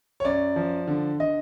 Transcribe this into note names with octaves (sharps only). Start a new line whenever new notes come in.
C#5
F#2 D5
F3
D3
D3 D#5